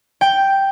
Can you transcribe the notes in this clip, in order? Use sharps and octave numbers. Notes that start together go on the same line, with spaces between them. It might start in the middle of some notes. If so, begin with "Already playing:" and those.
G5